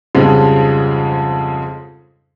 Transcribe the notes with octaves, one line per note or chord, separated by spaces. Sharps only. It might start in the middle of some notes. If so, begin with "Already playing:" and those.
F2 G#2 C#3 F3 G3 G#3